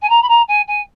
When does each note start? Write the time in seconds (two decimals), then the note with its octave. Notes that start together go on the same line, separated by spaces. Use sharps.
0.02 G#5
0.09 A#5
0.22 B5
0.28 A#5
0.48 G#5
0.67 G#5